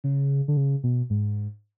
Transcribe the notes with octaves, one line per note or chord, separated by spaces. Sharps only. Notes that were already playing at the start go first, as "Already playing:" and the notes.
C#3
D3
C#3
B2
G#2